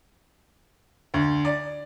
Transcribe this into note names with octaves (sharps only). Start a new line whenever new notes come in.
D2
D5